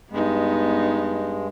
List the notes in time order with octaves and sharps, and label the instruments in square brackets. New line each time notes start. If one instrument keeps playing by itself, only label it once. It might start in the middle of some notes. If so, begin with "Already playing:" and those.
[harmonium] G2 G#3 [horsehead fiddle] B3 D#4